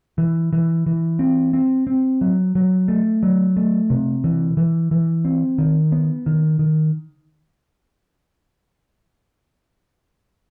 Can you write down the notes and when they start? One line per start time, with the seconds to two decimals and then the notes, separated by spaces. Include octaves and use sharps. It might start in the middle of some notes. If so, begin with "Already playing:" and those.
0.18 E3
0.53 E3
0.86 E3
1.19 C4
1.53 C4
1.87 C4
2.21 F#3
2.55 F#3
2.88 A3
3.23 F#3
3.56 A3
3.90 C3
4.24 E3
4.57 E3
4.91 E3
5.25 C4
5.58 D#3
5.92 B3
6.26 D#3
6.59 D#3